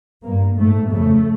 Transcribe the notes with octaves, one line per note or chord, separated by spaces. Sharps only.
G2 A#3
G#2 A3
F2 C#3 A3